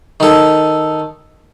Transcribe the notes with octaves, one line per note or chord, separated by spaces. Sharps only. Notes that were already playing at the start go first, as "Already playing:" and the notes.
D#3 A4